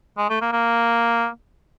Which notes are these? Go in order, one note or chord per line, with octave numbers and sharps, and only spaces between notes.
G#3
A3
A#3
A#3